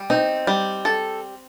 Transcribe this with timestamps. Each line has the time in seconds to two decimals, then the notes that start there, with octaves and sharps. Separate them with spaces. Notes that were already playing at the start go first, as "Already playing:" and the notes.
Already playing: G3
0.10 C4 D#4
0.47 G3
0.85 A4